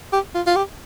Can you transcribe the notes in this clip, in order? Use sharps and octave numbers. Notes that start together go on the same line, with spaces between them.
G4
F4
F4
G4